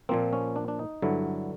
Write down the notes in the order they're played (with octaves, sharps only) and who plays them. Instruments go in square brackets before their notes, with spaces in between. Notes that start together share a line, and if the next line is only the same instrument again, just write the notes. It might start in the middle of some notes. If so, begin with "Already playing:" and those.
[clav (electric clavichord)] A#2 F3 A#3 C4
C#4
D4
D4
D#4
G2 D3 F#3 E4